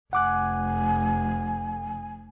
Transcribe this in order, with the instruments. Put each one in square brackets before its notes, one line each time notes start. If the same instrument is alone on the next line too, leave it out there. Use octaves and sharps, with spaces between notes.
[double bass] F1 [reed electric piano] F#5 D6 F#6 [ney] G#5